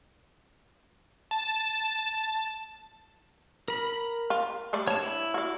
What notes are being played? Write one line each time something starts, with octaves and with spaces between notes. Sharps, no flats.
A5
A#4 B5
F4
G3 A3 D5
D4 C#5 A5
E4
F#4 D5